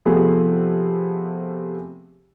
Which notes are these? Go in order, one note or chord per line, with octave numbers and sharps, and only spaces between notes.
C3 F3 A3 B3 G#4